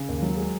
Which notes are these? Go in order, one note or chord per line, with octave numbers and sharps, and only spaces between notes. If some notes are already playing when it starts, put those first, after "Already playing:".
Already playing: C#3
D#2
F#3
G#3